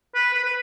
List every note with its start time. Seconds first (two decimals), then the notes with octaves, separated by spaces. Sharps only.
0.15 B4
0.33 B4
0.44 B4